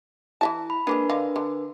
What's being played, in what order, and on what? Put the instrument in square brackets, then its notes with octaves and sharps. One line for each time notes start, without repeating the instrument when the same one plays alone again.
[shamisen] E3 E5 A5 [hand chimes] E4
[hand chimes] B5
[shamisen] G#3 A#3 B3 [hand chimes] D4 A#4 B4
[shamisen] D3 D#5 F5
D3